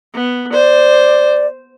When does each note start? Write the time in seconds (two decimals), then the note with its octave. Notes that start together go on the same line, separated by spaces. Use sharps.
0.14 B3
0.52 C5 D5